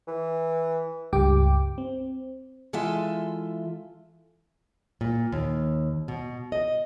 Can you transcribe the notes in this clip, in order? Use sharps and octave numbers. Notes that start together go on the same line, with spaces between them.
E3
C#2 G2 G4 G5 D6
C4
E3 G#3 F4 A4 E5 G#5
A#2
D#2
B2
D#5